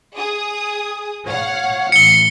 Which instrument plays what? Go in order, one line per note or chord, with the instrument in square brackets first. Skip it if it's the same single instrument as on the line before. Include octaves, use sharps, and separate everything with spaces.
[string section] G#4 D#6
C#5 F5 F#5
[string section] A1 C7 [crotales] C#7 G7